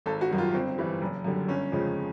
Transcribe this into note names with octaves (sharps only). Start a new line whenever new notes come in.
G#1 A4
F#4
F#2 D#3 G3
F4
G1 C4
G2 E3 G3
F#1
F#2 D3 G3
G1 C#4
F2 C#3 F3 G#3